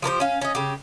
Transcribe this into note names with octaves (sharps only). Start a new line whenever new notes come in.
F3 G4 A#4 C5
C#4 F5
C#4 D#5
C#3 G4